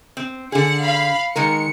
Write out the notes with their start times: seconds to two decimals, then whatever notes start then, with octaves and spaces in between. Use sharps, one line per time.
0.17 C4
0.52 D3 G#4 F#5
0.82 F5 B5
1.36 D#3 G#3 A#4 C#7